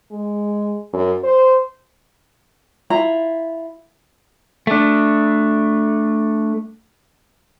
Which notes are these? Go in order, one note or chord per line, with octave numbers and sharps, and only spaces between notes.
G#3
F#2
C5
E4 F4 A#5
A3 D4